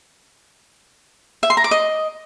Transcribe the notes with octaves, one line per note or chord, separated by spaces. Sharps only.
E5
C6
A#5
D6
D#5